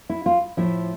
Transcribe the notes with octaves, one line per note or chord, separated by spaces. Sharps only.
E4
F4
A2 F3 A3 E4